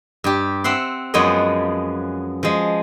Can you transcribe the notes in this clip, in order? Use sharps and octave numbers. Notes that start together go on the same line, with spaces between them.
G2 G4
C4 E5 F#5 C6
F#2 F3 G#3 B3 C#5 D#5
F3 G#3